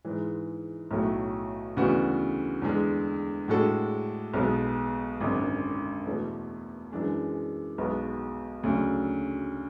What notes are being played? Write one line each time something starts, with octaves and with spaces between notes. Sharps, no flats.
G#2 E3 G#3
B1 A2 F#3 A3
D2 C#3 E3 B3 F#4
E2 D3 G#3
A2 G#3 D4 F#4 A4
B1 B2 G#3 B3
G#1 F#2 D3
E2 B2 A3
F#2 E3 G#3 D4 G#4
B1 B2 G#3 B3 F#4
D2 C#3 F#3